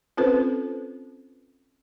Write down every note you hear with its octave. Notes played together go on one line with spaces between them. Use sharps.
C4 C#4 F4 A4 B4 C5